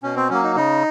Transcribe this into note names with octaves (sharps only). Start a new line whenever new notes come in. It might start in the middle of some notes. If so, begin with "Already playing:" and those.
B2 C#4
C4
F#3 A#3 C#4
D#4
C#3 D#4